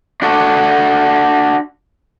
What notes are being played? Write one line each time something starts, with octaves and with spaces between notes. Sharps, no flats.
D4 F#4 A4